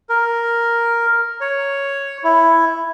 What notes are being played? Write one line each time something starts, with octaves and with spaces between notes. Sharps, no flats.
A#4
C#5
E4